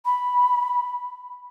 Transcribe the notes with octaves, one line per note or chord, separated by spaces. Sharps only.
B5